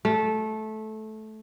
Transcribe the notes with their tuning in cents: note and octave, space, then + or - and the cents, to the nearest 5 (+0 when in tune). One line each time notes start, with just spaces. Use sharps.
A3 -15